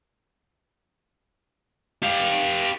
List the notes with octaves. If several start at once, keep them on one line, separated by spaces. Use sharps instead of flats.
G4 F5